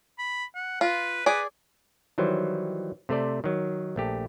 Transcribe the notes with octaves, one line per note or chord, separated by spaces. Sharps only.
B5
F#5
F4 B4
G#4 B4 D5
D#3 E3 F#3 G3 C5
C3 A3 C5 D5
D#3 F#3
A#1 A3 G4